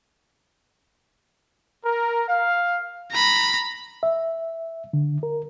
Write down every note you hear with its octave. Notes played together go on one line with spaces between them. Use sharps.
A#4
F5
A#5 B5
E5
D3
A#4